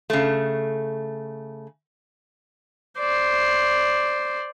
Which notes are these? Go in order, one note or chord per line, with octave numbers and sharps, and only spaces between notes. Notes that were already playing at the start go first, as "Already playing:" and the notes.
C#3 A3
C5 D5